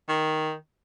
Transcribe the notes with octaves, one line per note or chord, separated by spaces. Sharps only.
D#3